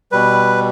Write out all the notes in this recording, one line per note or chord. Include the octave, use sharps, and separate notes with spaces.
B2 G3 B4